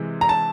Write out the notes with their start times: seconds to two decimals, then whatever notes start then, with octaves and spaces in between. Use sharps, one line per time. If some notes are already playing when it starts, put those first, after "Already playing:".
Already playing: C3 E3 G#3
0.21 A#5
0.29 A5